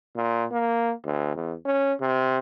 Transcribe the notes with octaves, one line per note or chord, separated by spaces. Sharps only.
A#2
A#3
D2
E2
C#4
C3